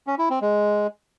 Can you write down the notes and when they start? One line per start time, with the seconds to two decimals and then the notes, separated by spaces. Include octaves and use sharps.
0.07 C#4
0.18 E4
0.30 C4
0.41 G#3